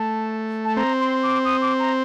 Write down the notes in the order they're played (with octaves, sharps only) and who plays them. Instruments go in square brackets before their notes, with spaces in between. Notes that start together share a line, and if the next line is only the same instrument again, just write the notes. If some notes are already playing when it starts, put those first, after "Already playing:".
Already playing: [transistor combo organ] A3 [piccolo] A5
[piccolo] A5
[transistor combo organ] C4 [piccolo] A#5
[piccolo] C6
D6
D#6
D6
A#5